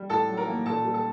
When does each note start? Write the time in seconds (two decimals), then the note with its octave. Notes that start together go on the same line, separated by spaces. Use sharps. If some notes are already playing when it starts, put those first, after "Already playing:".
Already playing: G3
0.09 A2 A4 A5
0.29 F#3
0.37 A#4 A#5
0.47 A#3
0.66 A#2 A4 A5
0.85 G3
0.94 A4 A5